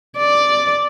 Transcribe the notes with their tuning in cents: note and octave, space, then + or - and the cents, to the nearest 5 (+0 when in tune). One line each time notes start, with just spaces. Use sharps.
D5 +0